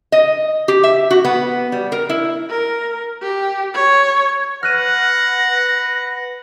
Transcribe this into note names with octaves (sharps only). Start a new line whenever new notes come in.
D#5
G4
E5
F#4
B3
G3
A#4
E4
A#4
G4
C#5
B4 F#5 F6 F#6 A#6 D#7